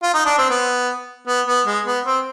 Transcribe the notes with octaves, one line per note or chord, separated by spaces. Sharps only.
F4
D#4
D4
C4
B3
B3
B3
G#3
B3
C4